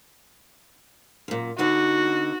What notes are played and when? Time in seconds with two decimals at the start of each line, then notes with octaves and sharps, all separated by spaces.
1.28 F#2 A#2
1.58 D3 B3 D#4 F#4